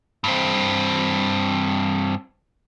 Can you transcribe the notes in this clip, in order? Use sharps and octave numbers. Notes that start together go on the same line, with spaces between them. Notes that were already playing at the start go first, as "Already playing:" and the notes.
G2 C4